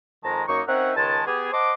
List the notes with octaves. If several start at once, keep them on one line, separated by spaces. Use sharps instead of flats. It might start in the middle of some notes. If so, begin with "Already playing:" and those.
F2 D#3 G#3 A5 A#5
F#2 A#3 D#4 D#5 C#6
C4 C#4 D#4 A#4 E5 F#5
C#2 D#3 G#3 G#5 A5
B3 G4 G#4
C5 D#5 F#5 A5 C6 D6